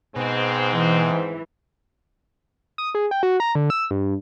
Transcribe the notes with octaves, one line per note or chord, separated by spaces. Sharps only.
G#2 B2 G#3 C4
E3
D#6
G#4
G5
F#4
A#5
D3
E6
G2